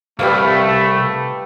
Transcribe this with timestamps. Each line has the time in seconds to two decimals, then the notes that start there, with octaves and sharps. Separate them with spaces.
0.19 C2 G3 A3 B4 F5